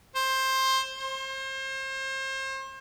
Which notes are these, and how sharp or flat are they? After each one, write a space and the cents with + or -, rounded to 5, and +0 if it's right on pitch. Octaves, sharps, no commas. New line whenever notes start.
C5 +15
C5 +35